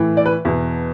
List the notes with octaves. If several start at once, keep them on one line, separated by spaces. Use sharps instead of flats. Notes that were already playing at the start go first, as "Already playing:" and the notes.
Already playing: A2 E3
D5
B4
E2 B2